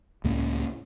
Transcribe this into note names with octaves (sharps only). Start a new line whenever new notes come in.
C#2 A2 A#3 C#4